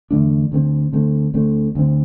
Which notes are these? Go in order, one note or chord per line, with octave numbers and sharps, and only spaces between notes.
E2 D3 A3 D4
D2 D3 A3 C4
D2 D3 A3 C4
D2 D3 A3 C4
D2 D3 A3 C4